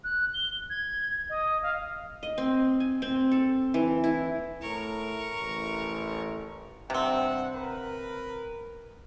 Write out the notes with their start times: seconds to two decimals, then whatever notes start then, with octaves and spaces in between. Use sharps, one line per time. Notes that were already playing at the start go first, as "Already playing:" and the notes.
0.04 F#6
0.34 G7
0.70 G#6
1.29 D#5
1.62 F5
2.23 D#5
2.38 C4
2.80 G#5
3.02 C4
3.32 A4
3.74 E3
4.04 E4
4.61 A2 A#4 C#6
5.39 A1
6.90 G2 C3 C4 F#5
7.55 A#4 B4